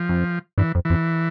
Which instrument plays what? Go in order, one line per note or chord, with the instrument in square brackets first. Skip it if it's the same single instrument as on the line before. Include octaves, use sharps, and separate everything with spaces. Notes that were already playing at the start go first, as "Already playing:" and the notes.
Already playing: [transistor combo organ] F3
[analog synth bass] F2
[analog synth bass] G2 [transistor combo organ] E3
[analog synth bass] F2
[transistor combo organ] E3
[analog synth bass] F2